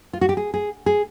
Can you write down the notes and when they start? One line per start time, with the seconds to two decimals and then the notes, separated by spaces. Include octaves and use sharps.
0.13 F4
0.21 F#4
0.29 G4
0.37 G#4
0.54 G#4
0.86 G#4